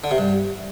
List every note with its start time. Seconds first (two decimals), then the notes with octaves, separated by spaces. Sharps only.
0.04 D3
0.11 C3
0.18 G2